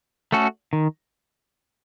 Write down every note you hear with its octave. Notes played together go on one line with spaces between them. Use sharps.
A3 C#4 F#4 A4
D#3